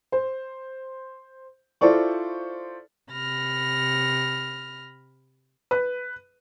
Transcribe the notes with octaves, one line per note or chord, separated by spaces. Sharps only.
C5
E4 F4 A4 C5 D5 C#6
C3 B5 F6 A#6
B4